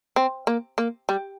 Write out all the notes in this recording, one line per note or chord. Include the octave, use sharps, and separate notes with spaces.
C4
A#3
A#3
G3